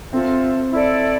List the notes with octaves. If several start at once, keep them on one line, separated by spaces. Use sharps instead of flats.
C4 F4 A4 E5
E4 A4 D5